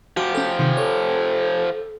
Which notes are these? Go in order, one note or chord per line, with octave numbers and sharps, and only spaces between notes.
F3 F#4 G4
C#4 A4
C3 D#3
A4 C#5